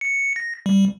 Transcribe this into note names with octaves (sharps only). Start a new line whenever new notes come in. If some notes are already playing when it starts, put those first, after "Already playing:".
C#7
A#6
G3